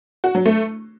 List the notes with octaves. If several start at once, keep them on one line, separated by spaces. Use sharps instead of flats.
F#4
F#3
A3